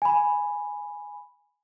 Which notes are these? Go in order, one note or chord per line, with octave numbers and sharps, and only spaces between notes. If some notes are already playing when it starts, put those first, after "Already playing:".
G#5 B5